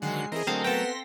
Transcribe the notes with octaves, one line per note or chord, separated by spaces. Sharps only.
D3 D#3 F#3 G#3 F#4 C7
E3 C4 G#4 A#4 D#5
D3 F#3 A3 C4 A#4 F5
B3 A4 G5 C6 A#6 B6